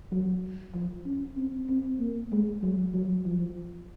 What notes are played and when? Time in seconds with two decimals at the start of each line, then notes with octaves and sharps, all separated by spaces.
0.12 F#3
0.74 F3
1.06 C#4
1.37 C4
1.69 C4
2.00 A#3
2.32 G#3
2.63 F#3
2.94 F#3
3.26 F3